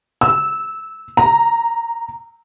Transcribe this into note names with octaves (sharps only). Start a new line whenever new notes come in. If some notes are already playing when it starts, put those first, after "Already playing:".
E6
A#5